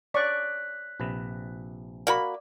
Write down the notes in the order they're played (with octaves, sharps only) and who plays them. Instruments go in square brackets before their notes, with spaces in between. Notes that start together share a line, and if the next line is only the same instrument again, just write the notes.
[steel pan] C#5 D5 C#6 [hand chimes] F#6 B6
[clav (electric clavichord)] A#1 C3 B4
[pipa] A#3 F#4 B5 [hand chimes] D5